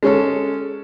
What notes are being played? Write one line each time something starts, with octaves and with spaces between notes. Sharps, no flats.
G#3 C#4 A4